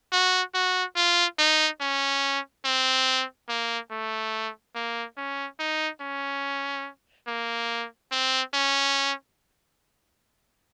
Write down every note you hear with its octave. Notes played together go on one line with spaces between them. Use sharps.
F#4
F#4
F4
D#4
C#4
C4
A#3
A3
A#3
C#4
D#4
C#4
A#3
C4
C#4